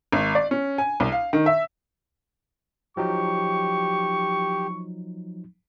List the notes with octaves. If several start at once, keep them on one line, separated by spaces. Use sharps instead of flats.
G#1
D5
C#4
G#5
C2
F5
D#3
E5
F3 F#3 D#4 G4 C#6